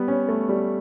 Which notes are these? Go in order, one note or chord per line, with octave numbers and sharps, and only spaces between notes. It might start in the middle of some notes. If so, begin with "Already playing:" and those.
Already playing: G3 B3
C#4
A3
G3